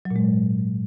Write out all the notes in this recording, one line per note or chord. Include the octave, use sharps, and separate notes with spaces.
F#3
A#2
G#3
G#2